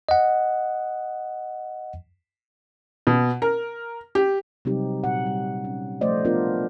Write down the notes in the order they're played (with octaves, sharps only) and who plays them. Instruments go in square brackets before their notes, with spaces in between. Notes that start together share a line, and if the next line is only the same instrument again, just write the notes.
[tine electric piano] D#5 F#5
[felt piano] B2
A#4
G4
[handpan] C3 F#3 G3 C4 D#4 G4
A#2 F#5
G3
C#4
F3 A3 C5 D5 D#5
A3 B3 D4 F4 A#4